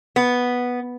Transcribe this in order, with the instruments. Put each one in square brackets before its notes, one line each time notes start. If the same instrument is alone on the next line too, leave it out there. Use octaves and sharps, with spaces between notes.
[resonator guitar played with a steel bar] B3